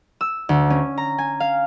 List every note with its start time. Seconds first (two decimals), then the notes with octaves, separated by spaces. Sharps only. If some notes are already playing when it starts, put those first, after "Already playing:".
0.21 E6
0.49 D2
0.70 C#4
0.98 A#5
1.18 G#5
1.40 F5